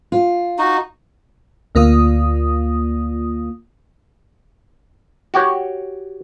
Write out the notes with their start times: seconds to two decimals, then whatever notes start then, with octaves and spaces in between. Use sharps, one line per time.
0.12 F4
0.58 D#4 F#4
1.75 D2 A#3 F4 D#6
5.34 F#4 G4 C#5